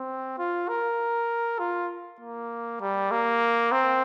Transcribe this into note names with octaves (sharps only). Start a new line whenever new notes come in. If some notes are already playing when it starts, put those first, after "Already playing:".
Already playing: C4
F4
A#4
F4
A#3
G3
A#3
C4